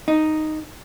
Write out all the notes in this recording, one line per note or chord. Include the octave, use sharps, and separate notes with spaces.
D#4